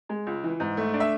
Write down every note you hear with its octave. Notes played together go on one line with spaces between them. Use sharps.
G#3
C#2
E3
G#2
A3
D4
E5